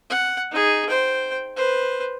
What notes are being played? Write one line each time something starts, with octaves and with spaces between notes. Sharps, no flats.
F#5
D#4 G#4
C5 G5
B4 C5